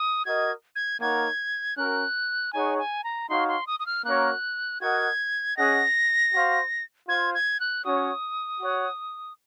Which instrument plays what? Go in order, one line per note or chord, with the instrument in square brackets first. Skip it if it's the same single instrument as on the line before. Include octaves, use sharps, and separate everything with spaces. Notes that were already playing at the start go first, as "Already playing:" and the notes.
Already playing: [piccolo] D#6
[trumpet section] F#4 A#4 D#5 [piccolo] G#6
[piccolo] G#6
[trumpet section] A#3 D#4 A#4 C#5 F#5 [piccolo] G#6
[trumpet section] C#4 F#4 A#4 [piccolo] F#6
[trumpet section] D#4 G#4 C#5 F#5 [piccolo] G#5
[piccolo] G#5
A#5
[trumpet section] D#4 F#4 C#5 F5 [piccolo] C6
[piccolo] C6
D#6
D#6
F6
[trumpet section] A#3 C#4 F#4 A#4 C#5 [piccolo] F#6
[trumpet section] F#4 A#4 D#5 F#5 [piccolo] G#6
[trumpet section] C#4 G#4 D#5 F#5 [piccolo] A#6
[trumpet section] F#4 C5 F5
[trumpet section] F4 C5 F5 [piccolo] G#6
[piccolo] G#6
F#6
[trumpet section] C#4 F#4 C#5 [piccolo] D#6
[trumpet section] F#4 C#5 F#5